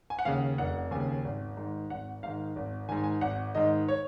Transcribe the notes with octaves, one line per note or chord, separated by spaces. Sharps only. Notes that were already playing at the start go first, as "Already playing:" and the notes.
G#5
F#5
D#2 C#3 F5
F1 F#5
D#2 C#3 G#5
G#1
G#2 D#3
G#1 F#5
G#2 D#3 F5
G#1
G#2 D#3 G#5
G#5
G#1 F#5
G#2 D#3 D#5
C#5